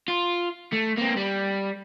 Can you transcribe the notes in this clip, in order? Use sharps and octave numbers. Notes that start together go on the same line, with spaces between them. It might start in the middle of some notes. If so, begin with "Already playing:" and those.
F4
A3
A#3 C4
G3